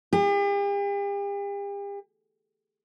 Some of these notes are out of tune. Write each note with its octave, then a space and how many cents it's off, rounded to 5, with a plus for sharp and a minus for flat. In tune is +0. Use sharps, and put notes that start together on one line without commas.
G4 +45